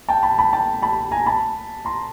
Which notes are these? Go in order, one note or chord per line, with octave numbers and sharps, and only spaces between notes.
G5 A5
A5 B5
A5 B5
G5 A5
A5 B5
G#5 A#5
A5 B5
A#5 C6